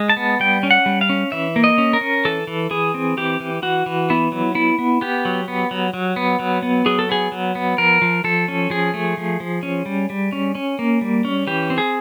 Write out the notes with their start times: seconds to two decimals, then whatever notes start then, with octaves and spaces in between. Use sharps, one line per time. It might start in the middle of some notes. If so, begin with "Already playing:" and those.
Already playing: G#3
0.10 A5
0.17 B3
0.40 G3 G5
0.63 C#4
0.71 F#5
0.86 G3
1.01 F5
1.09 C#4
1.32 E3 E5
1.56 A#3
1.64 D#5
1.78 C#4
1.93 A#4
2.01 C#4
2.25 E3 A4
2.47 E3
2.71 E3 G#4
2.94 C4
3.17 E3 G4
3.40 E3
3.62 E3 F#4
3.86 E3
4.10 B3 E4
4.32 F#3
4.55 B3 E4
4.79 B3
5.01 B3 G4
5.25 F#3
5.48 B3
5.71 F#3
5.94 F#3
6.16 B3
6.39 F#3
6.63 B3
6.86 F#3 G#4
6.99 A4
7.09 B3 G#4
7.32 F#3
7.55 B3
7.78 F3 A#4
8.02 F3
8.24 F3 A4
8.48 C#4
8.70 F3 G#4
8.94 A3
9.17 F3
9.40 F3
9.63 C#4
9.86 G3
10.10 G3
10.32 C#4
10.55 C#4
10.79 A#3
11.01 G3
11.25 C#4
11.47 E3 G4
11.70 C4
11.78 G#4